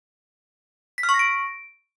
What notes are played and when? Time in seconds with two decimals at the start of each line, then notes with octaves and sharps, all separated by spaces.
0.98 B6
1.03 F6
1.09 C#6
1.14 A#6
1.19 D7